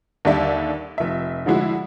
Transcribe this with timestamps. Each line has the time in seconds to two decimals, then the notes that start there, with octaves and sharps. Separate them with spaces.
0.25 D#2 D3 G3 D5 E5
0.98 F1 E5
1.46 D3 F3 G#3 E4 F#4